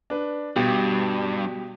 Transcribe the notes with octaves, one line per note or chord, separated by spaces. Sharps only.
D4 B4
G2 B2 G4